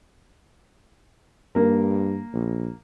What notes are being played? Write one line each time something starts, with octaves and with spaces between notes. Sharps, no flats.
G2 A#3 A#4
A#1